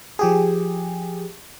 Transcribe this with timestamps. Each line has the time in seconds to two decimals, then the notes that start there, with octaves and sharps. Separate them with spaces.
0.19 F3 G4 G#4